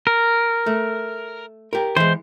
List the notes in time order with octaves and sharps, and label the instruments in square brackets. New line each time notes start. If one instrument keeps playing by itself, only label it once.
[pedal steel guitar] A#4
[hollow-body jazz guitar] A3
G4 A#4
[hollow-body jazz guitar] E3 G#3 [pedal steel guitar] C5